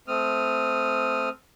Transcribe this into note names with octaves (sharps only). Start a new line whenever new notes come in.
A3 C4 D#6 F6